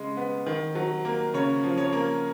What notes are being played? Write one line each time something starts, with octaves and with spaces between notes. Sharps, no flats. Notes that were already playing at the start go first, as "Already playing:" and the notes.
Already playing: C#3 G#3
B3
D#3
F#3
A#3
C#3 C#5
F3
C#5
A#3